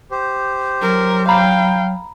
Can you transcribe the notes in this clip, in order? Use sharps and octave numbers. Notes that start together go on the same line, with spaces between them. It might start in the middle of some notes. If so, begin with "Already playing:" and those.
G4 C5
F#3 A#4
F5 G5 A#5 B5